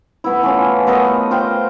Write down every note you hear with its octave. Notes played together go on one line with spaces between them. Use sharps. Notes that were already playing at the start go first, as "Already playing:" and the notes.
A3 B3 E4
E3 A3 C#4 F4
A3 B3 A#4 D#5
F4 C5 F5 G5